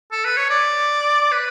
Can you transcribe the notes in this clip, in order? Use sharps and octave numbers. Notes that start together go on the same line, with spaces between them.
A4
B4
C#5
D5
B4